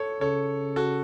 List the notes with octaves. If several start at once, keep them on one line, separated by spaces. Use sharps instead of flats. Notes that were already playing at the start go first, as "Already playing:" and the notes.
Already playing: A4 C#5
C#3 A4 C#5
F#4 A4